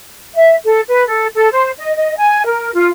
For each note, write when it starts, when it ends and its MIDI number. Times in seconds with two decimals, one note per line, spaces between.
0.35 0.55 76
0.65 0.81 69
0.88 1.07 71
1.07 1.27 69
1.35 1.49 69
1.52 1.71 72
1.79 1.94 75
1.96 2.13 75
2.17 2.45 80
2.45 2.71 70
2.74 2.90 65